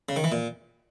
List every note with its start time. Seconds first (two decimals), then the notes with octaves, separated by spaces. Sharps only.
0.09 C#3
0.16 D#3
0.24 E3
0.32 A#2